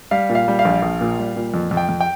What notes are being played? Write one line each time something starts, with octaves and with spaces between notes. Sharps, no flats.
G3 F5
A#2
F5
G3
F5
A#1
A#1
A#2
G3
A#2
F2
F2
G5
F2
G5